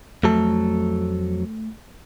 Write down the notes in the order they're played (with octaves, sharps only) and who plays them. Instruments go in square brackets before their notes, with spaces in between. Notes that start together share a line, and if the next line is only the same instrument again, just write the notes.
[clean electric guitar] F2 F#3 A4 [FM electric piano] A3